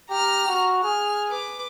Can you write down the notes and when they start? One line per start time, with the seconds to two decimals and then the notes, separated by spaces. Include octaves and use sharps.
0.10 G4 A#5 F6
0.48 F#4
0.83 G#4 F6
1.28 B4 D6